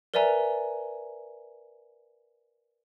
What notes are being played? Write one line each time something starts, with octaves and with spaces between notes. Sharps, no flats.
A#4 B4 D5 E5 G#5 A#5